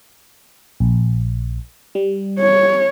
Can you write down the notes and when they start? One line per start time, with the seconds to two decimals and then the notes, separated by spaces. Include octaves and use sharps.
0.80 A#1
1.95 G3
2.39 C#5